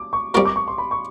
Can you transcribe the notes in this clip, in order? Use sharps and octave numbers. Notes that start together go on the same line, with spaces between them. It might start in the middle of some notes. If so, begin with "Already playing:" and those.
Already playing: D6
C#6
G3 C4 F4 A#4 C#6
D6
C#6
C6
B5
C#6